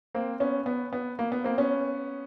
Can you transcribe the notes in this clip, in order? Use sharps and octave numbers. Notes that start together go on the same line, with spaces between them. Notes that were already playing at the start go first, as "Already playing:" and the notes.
A#3 C4
B3 C#4
B3
B3
A#3
B3
A#3 C4
B3 C#4